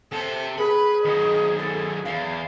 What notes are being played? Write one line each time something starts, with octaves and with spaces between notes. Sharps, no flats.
C3 A4
G#4 B4 B5
D#3 F#3 D#5
G#4 A4
E2 F5